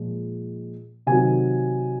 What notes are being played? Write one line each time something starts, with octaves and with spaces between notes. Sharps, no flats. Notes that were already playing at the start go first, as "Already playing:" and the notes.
Already playing: A#2 F3 G#3
C3 D#3 F#3 G#5